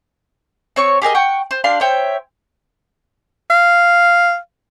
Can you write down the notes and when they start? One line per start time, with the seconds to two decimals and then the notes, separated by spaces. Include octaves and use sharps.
0.76 C4 C#5 C#6
1.02 G4 G#4 A#4 D#5
1.15 F#5 G5 C#6
1.51 C5
1.64 D4 G4 F5 C6
1.81 C5 C#5 E5 G5
3.50 F5